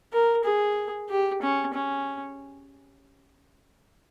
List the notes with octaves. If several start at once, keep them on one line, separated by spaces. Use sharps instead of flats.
A#4
G#4
G4
C#4
C#4